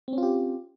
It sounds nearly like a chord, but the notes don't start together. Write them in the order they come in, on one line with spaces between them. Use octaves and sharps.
C4 C#4 F4 G4